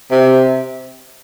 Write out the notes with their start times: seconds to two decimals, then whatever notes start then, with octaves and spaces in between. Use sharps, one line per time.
0.11 C3